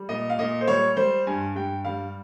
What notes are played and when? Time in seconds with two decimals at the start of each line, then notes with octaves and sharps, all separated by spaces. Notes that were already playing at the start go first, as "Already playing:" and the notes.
Already playing: G3
0.09 A#2 D#5
0.30 F5
0.39 A#2 D#5
0.61 C5
0.67 G3 C#5
0.97 G3 C5
1.27 G2 G#5
1.56 G2 G5
1.84 G3 F5